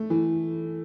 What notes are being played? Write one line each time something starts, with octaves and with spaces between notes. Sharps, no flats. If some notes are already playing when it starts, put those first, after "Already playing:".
Already playing: A3
E3